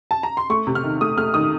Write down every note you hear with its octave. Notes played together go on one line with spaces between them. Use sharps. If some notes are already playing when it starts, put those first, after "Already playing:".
A5
A#5
C6
A3 C#6
C3
F6
D#3
A3 D#6
A3 F6
D#3 D#6